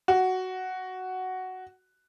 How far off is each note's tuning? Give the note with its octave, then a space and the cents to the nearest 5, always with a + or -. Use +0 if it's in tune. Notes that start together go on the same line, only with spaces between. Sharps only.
F#4 +5